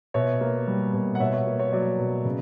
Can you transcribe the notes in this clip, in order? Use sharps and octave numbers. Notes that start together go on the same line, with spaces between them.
B2 C#5 E5
A#3
G3
B2
F#5
B2 C#5 E5
C#5
A#3
C#5
F#3 D5
B2
C#3